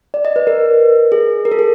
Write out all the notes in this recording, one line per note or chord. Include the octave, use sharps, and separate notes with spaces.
D5
D#5
B4
A#4
G#4
A#4
A4
G#4